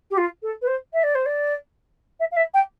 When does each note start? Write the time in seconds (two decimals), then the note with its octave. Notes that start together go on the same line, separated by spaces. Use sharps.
0.11 G4
0.17 F4
0.42 A4
0.62 B4
0.67 C5
0.93 E5
1.03 D5
1.15 C5
1.26 D5
2.20 E5
2.31 F5
2.36 E5
2.54 G5